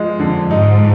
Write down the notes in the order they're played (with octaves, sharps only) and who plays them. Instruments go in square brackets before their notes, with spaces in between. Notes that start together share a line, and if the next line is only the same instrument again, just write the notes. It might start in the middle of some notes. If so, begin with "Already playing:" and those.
Already playing: [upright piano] F3 G#3
[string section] F2 [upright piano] D3
[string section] G#2 [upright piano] D#4